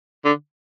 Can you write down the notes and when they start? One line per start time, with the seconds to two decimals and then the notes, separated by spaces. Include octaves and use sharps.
0.25 D3